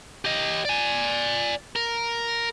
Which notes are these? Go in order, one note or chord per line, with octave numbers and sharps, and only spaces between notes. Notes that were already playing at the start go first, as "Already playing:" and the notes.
G4 D#5
D5 G#5
A#4